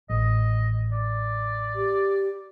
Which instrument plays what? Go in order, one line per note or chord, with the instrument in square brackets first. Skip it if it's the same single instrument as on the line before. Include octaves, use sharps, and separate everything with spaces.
[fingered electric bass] A1 [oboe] D#5
[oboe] D5
[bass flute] G4